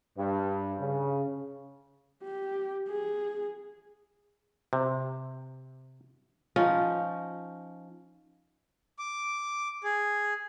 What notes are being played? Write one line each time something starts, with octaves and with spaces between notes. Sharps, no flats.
G2
C#3
G4
G#4
C3
F3 C#4 D#4
D6
G#4